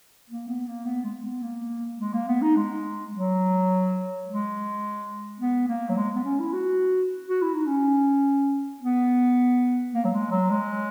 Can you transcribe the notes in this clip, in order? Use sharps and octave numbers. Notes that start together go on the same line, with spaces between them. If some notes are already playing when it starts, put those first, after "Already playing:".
A#3
B3
A#3
B3
G#3
B3
A#3
G#3
A#3
B3
D#4
G#3
F#3
G#3
B3
A#3
F#3
G#3
B3
C#4
E4
F#4
F#4
E4
D#4
C#4
B3
A#3
F#3
G#3
F#3
G#3